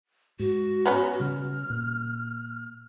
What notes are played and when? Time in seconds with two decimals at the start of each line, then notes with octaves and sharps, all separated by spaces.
0.39 G#2 F#4
0.86 F#3 B3 C#4
1.20 C#3 G3 F6
1.70 A#2